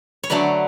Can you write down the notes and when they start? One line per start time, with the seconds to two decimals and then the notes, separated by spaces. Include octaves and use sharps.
0.23 C#5
0.30 D3 F#3 A3 B4 D5